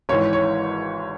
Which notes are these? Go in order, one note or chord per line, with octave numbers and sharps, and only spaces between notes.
G#1 G#2 E3 C#5
C#5